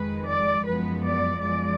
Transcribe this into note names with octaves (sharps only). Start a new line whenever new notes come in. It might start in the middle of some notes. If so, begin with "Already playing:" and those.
Already playing: F2 D#3 G#3 B4
D5
F#2 F3 G#3 B3 B4
D5
F#2 F3 G#3 D5